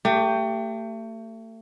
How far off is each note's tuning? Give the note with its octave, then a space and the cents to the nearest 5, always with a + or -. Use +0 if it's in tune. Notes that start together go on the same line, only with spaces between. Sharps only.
A3 +35 G4 +0